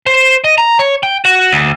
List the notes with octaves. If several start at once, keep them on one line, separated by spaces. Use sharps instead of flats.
C5
D#5
A#5
C#5
G5
F#4
D2